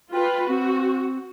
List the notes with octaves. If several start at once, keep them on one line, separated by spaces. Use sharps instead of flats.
F4 B4 G5
C4 F#4